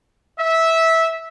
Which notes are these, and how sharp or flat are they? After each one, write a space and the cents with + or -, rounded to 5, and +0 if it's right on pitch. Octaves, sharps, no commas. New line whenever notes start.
E5 -15